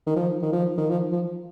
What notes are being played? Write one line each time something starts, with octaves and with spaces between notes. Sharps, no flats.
D#3
F3
D#3
F3
D#3
F3
F3